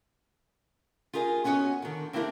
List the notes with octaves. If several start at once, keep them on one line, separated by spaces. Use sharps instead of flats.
F4 G4 G#4 A#4 D#5
B3 C#4 F#4 B4 C#5 D#5
D3 D#3
A#3 C4 D4 E4 G4 A#4